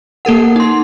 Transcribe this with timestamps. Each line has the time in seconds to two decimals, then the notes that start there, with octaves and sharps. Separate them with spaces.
0.25 A#3 A4 A#4 F#5
0.56 D#4 C6